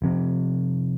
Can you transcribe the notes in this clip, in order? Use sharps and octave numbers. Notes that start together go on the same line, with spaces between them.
F1 F2 C3